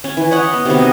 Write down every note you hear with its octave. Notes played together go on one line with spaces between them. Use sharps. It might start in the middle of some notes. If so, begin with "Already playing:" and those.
C#4
E3
B4 C#5 D#5 F#5
B3
C3 D#3 F#3 B3
D#5